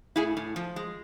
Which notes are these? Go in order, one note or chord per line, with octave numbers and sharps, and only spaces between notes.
A2 E4 G#4
A2
F3
G#3